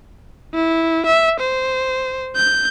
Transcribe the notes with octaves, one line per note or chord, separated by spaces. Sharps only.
E4
E5
C5
G6